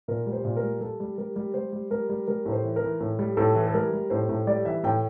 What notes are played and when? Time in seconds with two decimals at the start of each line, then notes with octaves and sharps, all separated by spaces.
0.08 A#2 A#4
0.26 G3
0.33 C5
0.45 A#2
0.57 A#4
0.63 G3
0.81 G3 A4
1.00 G3
1.18 G3 A#4
1.36 G3
1.54 G3 C5
1.72 G3
1.90 G3 A#4
2.09 G3
2.27 G3 A#4
2.46 A2
2.52 C5
2.64 E3
2.76 A#4
2.83 E3
3.00 A2
3.19 G3
3.37 A2 A4
3.55 E3
3.67 A4
3.74 G3 A#4
3.93 G3
4.10 A2 C5
4.29 A2
4.47 G3 D5
4.65 E3 E5
4.84 A2 G5